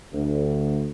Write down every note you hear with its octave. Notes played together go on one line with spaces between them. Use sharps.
D2